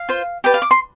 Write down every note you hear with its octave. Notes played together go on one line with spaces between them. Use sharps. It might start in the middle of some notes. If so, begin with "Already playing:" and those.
Already playing: F5
F4 C5
G4 B4 D5 G5
F5
D6
C6